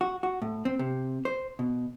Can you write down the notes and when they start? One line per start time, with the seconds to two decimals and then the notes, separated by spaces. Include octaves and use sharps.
0.01 F#4
0.23 F#4
0.42 A2
0.65 C4
0.79 C3
1.25 C5
1.59 B2